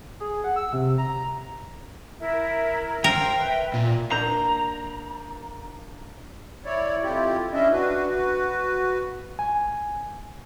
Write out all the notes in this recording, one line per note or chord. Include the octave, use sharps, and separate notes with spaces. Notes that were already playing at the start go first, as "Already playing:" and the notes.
G#4
F#5
E6
C3
A#5
E4 A#4 E5
A#4 C5 F5 G5
B4 E5
A#2
A#3 D4 A#5 G6
E4 C#5 D5
F2 E4 F4 G4
C#4 D4 E4 D#5 E5
D4 F#4 B4
F#4 B4
G#5